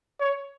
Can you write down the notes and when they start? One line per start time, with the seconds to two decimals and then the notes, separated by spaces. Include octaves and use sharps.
0.20 C#5